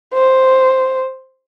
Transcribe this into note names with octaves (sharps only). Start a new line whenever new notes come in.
C5